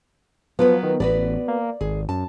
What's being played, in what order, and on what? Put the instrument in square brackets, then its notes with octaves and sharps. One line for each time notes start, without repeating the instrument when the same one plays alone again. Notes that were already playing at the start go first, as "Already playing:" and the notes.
[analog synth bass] F3 [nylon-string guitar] F#3 F4 B4 [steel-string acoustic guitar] B3
[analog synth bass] D#3
[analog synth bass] A1 [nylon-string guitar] B3 F#4 B4 [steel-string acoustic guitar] D5
[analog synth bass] A#3
[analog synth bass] G#1 [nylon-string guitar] G#4
[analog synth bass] F#2 [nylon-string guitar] A5